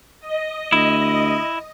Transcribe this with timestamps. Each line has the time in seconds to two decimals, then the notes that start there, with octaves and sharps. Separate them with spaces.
0.20 D#5
0.72 D2 E4